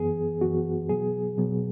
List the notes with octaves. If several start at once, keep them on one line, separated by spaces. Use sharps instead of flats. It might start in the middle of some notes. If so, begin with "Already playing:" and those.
Already playing: F#2 E3 B3 G#4
F#2 E3 B3 F#4
B2 F#3 B3 G#4
B2 F#3 B3